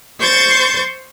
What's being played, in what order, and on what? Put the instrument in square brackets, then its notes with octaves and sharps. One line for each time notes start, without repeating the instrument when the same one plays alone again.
[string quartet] C5 C#6 G6 A6